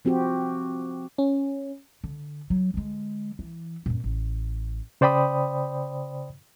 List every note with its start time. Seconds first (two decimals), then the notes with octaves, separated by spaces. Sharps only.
0.05 F3 C4 F#4 G4
1.18 C#4
2.04 D3
2.50 F#3
2.74 D3 G#3
3.39 E3
3.86 F#2 A#2
4.04 A1
5.01 C#3 C5 D5 G5 B5 D#6